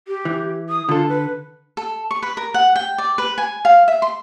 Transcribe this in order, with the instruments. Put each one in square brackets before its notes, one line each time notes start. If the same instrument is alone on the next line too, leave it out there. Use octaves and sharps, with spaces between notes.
[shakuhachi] G4
[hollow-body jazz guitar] E3
[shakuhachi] D#6
[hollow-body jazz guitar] D3 A4 [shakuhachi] F4
[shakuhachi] B4
[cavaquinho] A4
C#6
B4
A#4
F#5
G5
D5
B4
G#5
F5
E5
C6